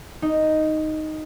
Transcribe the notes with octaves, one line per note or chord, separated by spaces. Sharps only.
D#4